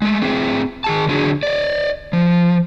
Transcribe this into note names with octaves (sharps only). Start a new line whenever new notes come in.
G#3 A3
A3 C4 G#4 B4
D#3 G#4 A5
D3 F#3 G#4
D5 D#5
F3